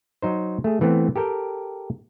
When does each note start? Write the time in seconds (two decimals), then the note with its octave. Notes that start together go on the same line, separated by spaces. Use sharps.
0.22 F#3 D#4 C5
0.64 A3 G#4
0.81 E3 A3 B3 C4
1.16 G4 A4 A#4 G5